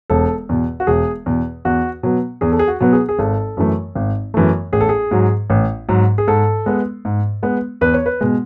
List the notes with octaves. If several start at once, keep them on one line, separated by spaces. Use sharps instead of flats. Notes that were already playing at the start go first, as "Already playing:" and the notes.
E1 A4
E2 B2
F#4
E1 G#4
E2 B2
E2 F#4
B2 F#3 B3
E2 G#4
A4
G#4
F#4
B2 F#3 B3
G#4
G#4
G#1 A4
F#2 E3 A3
G#1
F#2 E3 A3
A1 G#4
A4
G#4
G#2 F#3
A1
G#2 F#3
G#4
G#2 A4
G#3 B3
G#2
G#3 B3
E2 B4
C#5
B4
B2 G#3